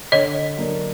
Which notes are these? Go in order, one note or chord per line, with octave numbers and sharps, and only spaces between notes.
D3 C#5 D#5
F#3 A#3 D4